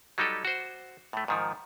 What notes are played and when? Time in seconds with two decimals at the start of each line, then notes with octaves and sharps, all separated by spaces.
0.18 F#3 G3 D#4 G4 A4
0.45 F#4 C5
1.13 A2 A3
1.28 G#2 D#3 F3